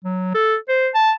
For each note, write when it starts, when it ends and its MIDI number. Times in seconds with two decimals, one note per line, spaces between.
0.05 0.33 54
0.35 0.56 69
0.69 0.89 72
0.94 1.12 81